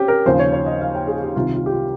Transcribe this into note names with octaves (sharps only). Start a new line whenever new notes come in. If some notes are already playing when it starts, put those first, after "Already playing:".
Already playing: C4 C#4 G4
A#4
D#2 C#3 F3 C5
C#5
C#5
D#5
F5
G5
G#4
G4
C2 C3 D#3 F4
F4
G4
F4